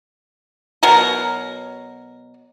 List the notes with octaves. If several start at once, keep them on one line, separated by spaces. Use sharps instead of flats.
B2 F#3 A#4